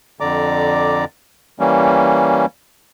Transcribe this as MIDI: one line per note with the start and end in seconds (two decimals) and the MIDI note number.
0.20 1.05 41
0.20 1.05 50
0.20 1.05 74
0.20 1.05 82
0.20 1.05 86
1.60 2.46 52
1.60 2.46 55
1.60 2.46 58
1.60 2.46 61